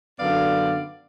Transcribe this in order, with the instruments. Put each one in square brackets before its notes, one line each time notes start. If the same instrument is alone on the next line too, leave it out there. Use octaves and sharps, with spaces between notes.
[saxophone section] F#2 D3 B3 D5 F5